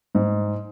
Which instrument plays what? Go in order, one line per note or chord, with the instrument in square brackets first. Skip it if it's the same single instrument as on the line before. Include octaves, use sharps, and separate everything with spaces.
[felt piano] G#2